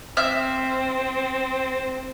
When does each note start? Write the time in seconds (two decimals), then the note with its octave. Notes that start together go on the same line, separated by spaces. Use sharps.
0.17 C4 E5 F6